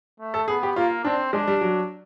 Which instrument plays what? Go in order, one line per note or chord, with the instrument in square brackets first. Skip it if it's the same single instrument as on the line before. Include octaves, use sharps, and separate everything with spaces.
[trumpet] A3
[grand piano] A4
[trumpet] B3 [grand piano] G#4
[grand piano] G4
[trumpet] A#3 [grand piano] F4
[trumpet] C4 [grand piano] D4
[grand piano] G#3 [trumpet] D4
[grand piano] G3
F#3